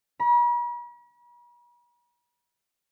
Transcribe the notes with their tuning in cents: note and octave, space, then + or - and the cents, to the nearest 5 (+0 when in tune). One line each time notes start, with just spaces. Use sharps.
B5 -45